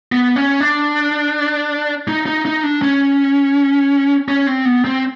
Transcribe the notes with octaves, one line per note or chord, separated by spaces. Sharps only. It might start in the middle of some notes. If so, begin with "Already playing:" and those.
B3
C#4
D4
D#4
D#4
D#4
D4
C#4
C#4
C4
B3
C4